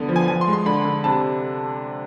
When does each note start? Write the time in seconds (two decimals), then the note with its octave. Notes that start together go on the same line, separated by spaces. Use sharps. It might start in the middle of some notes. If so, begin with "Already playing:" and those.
Already playing: D3 B3
0.09 F3
0.16 G#5
0.28 F3 G#5
0.41 C6
0.48 G#3
0.53 C6
0.66 D3 B5
0.85 D3
1.04 C3 A5